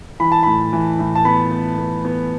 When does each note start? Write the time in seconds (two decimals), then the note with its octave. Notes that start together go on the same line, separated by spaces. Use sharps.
0.20 E3 B5
0.32 A5
0.43 A2 B5
0.73 E3
0.99 A2
1.15 A5
1.25 B3 B5
1.52 B3
1.78 B3
2.05 B3